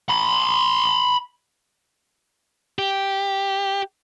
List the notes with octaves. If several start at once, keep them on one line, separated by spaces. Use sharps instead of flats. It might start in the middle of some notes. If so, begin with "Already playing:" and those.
B5 C6
G4